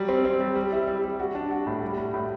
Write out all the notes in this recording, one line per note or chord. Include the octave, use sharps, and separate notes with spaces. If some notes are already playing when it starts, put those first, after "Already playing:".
Already playing: F#3 G3
C4
C4
G3
G3
E4
G3
G3
F#4
D4
F#4
A2
G3
A2
A2